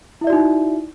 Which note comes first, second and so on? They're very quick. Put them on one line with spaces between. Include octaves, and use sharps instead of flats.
E4 E5 D5 F#4 D#4